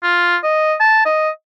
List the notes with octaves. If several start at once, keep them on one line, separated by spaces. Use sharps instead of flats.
F4
D#5
A5
D#5